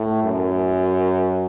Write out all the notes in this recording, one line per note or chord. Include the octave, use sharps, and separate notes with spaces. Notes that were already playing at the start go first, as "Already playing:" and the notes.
Already playing: A2
F#2